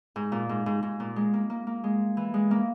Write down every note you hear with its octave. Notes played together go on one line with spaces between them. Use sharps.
G#2
A#2
G#2
G#2
G#2
A#2
G#3
A#3
A#3
A#3
G#3
E3
G#3
A#3